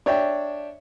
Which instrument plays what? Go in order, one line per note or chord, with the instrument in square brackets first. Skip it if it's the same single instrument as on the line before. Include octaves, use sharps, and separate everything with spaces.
[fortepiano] D4 C#5 E5 G5